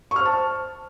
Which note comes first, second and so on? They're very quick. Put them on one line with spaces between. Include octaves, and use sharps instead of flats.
C#6 F6 C5 A5